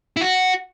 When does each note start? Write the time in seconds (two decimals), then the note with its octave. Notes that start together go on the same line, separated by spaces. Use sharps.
0.17 E4
0.21 F#4